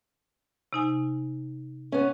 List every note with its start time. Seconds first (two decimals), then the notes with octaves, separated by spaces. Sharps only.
0.73 C3 D#4 G#5
1.92 B3 C#4